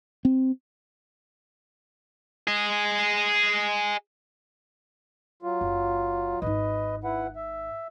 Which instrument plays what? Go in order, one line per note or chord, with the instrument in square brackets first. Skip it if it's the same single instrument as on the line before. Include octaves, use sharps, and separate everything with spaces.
[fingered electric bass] C4
[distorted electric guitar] G#4 D#5
[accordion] F#3 F4
[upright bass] F#1
[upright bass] G#1 D#4 [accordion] B4 D#5
[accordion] E4 B4 F#5
E5